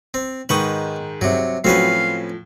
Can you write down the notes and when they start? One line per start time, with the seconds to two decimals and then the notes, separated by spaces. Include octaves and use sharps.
0.14 C4
0.49 G#2 D#3 B4 C#6 D#6 F#7
1.21 G2 C3 F#3
1.64 A2 F3 F#3 C4 C#4 F#4 B4 F5